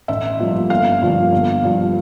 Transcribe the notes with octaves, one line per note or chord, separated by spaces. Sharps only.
A1 E5
G2 F3 A#3
G1 F5
G2 D3 F3 A#3
G1
G2 F3